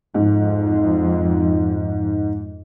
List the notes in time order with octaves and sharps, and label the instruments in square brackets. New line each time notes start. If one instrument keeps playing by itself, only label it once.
[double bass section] F2 [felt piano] G#2